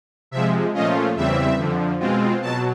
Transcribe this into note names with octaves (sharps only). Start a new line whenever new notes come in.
C3 F3 G#3 E5
A#2 F3 A3 C#4 F4 D#5
E2 C#3 E3 G3 C4 E5
F2 D3 F3
B2 G#3 C4 F4
B2 F#3 A5